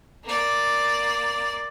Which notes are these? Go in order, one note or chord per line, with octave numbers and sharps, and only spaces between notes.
A#3 D5